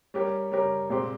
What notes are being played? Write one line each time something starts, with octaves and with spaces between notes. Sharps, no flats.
G3 C#4 G4 A#4 C#5
G3 C#4 G4 A#4 C#5
A#2 G#3 C4 G4 C5